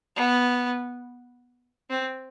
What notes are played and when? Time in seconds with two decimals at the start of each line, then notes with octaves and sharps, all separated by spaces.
0.16 B3
1.90 C4